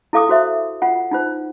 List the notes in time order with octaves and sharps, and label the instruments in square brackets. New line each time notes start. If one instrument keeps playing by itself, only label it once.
[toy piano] E4 A4 F5 D6 D#6
F#4 C5 E5
F4 F#5
D#4 F4 C5